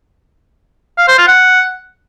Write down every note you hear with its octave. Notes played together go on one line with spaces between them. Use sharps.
F5
C5
F4
F#5